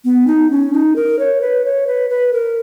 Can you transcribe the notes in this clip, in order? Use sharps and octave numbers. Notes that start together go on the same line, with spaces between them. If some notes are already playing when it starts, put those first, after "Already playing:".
B3
D#4
C#4
D#4
A#4
C#5
B4
C#5
B4
B4
A#4